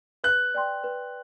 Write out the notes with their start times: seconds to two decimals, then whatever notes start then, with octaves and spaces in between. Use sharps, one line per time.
0.24 B4 F#6
0.54 D5 G5 C6
0.84 B4